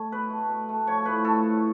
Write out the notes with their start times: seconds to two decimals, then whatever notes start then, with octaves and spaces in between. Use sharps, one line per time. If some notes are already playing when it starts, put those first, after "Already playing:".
Already playing: A3 C#5
0.12 B2 B4
0.30 A3
0.49 B2
0.69 A3
0.87 F3 C#5
1.05 A2 B4
1.25 A3 A4
1.43 A2